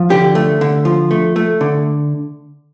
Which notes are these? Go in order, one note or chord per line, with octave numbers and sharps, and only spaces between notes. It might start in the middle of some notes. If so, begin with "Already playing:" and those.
Already playing: F3
D3 G4
A3
D3
F3
A3
A3
D3